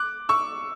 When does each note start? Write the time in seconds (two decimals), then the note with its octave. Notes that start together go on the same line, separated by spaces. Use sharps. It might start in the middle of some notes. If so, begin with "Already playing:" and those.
Already playing: D6 F#6
0.29 C#6 E6